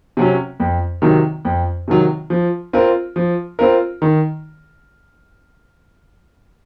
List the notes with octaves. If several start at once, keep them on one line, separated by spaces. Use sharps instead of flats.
C3 F#3 C#4
F2
C3 D#3 F#3
F2
C3 D#3 F#3
F3
C4 F4 A#4
F3
C4 F4 A#4
D#3